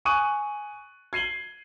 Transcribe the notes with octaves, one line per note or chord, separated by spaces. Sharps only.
G#5 C#6 D#6 F#6 D#7 F#7
G#6 C7 D#7 F#7 G7